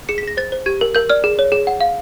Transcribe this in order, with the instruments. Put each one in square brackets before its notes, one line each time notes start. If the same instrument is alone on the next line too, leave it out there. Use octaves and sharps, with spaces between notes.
[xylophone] G#4 C#7
B6
G#4 A#6
C5 A6
C5
G4 G#6
A#4
A#4 G6
D5 F6
G#4
C#5
G#4
F#5
F5